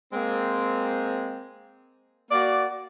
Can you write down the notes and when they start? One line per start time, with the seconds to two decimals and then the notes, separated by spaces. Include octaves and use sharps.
0.13 G#3 A#3 C4
2.31 A#3 F#4 D5